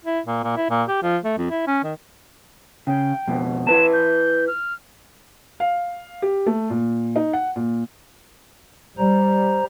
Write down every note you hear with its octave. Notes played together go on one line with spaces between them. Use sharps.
E4
A#2
A#2
E4
A#2
G4
F3
A3
F2
E4
C#4
D#3
C#3 G5
F2 B2
E4 B4 A5 E7
G6
F6
F5
G4
A3
A#2
D#4
F#5
A#2
G3 C5 A#5